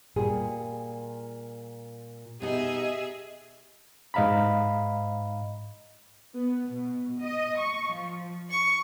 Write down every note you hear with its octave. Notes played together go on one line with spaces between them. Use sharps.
A#2 G3 G#4
B2 D#4 G4 G#4 D#5 E5
G#2 D#5 F5 A#5 B5
B3
B2
D#5
C#6
F3
C#6